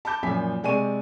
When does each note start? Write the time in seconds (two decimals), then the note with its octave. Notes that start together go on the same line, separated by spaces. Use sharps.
0.05 A5 B5 D6 G6
0.23 F#2 A#2 F3 G#5 B5 B6
0.63 C3 G#3 D5 G#5 C#6 D#7